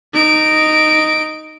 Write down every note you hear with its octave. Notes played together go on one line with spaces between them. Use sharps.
D#4 D7